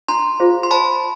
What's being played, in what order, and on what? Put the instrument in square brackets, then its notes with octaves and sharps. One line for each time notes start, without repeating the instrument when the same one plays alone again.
[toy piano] D4 [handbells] A#5 C6
[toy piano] F4 G#4 C5 F5
[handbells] C6
[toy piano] C5 [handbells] A5 B5